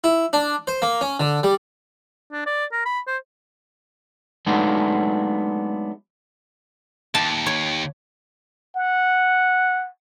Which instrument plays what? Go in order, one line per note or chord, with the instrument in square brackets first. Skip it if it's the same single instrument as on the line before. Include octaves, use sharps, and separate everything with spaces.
[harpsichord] E4
D4
C5
A#3
C#4
D3
G3
[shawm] D4
D5
A#4
B5
C5
[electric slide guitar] F#3 G#3 A3 B3 D4 D#4
[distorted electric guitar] D#2 [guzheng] A5
[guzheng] C#5
[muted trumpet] F#5